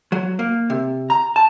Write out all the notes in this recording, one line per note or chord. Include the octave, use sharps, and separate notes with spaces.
F#3
A#3
C3
A#5
A5